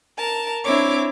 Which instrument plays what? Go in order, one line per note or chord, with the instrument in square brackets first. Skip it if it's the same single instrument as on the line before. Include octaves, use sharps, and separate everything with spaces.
[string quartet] A#4 A5
C4 D4 E4 C#5 D6